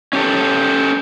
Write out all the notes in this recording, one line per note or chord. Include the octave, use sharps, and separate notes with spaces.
C#4 G4 A4